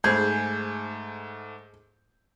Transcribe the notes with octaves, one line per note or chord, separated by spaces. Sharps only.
G#2 A3 D#4 G#4 C5 B5 G6